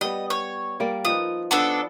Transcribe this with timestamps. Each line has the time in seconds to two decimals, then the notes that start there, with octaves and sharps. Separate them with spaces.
0.01 G3 B3 D#5
0.30 C#5
0.80 G3 A#3 D5
1.05 F3 D#4 B4 D#6
1.51 B3 D4 A4